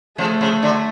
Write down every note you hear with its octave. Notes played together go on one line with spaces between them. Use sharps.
C#3 F3 A3
C#3 F3
D3 F#3